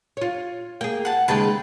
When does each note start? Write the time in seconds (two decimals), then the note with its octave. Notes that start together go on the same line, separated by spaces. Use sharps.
0.17 F4 C#5
0.81 A#3 G#4 G5
1.05 F#5 A5
1.28 D#2 C#3 G#3 B4 G5 A5